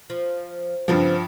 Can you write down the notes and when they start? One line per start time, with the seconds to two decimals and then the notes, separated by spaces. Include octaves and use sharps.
0.10 F3
0.88 G2 C#3 F3 B3 C4